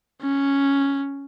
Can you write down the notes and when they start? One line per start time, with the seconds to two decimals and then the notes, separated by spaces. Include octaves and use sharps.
0.22 C#4